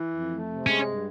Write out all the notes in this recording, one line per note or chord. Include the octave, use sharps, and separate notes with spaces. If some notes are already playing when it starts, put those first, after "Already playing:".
Already playing: E3
F2
A3
C3
G#3 C#4
G2